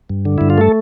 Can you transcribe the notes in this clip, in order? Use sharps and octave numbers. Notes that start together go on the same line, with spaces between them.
G2
D3
G2 E4
F4
A3 A4